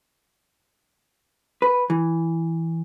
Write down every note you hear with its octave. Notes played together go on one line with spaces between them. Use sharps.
B4
E3